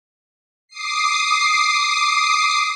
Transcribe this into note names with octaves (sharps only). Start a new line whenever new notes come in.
D6 D#6 C7